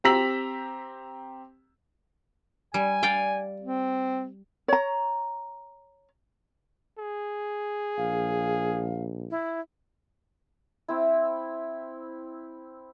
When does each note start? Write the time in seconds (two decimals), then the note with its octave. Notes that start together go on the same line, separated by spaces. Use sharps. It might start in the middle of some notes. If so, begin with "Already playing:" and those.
0.04 C4 G4 A#5 E6 B6 F#7
2.74 G3 G#5
3.03 D5 F5 G5
3.62 C4
4.68 C#5 A#5
6.98 G#4
7.97 A#1 F5
9.31 E4
10.88 C4 E4